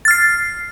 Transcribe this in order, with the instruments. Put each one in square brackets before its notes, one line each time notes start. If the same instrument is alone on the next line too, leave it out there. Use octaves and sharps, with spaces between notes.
[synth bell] A6
F6
C7